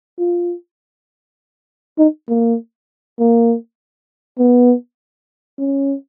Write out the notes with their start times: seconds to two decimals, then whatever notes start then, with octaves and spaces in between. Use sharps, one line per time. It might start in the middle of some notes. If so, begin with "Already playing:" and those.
0.19 F4
1.98 D#4
2.29 A#3
3.20 A#3
4.38 B3
5.59 C#4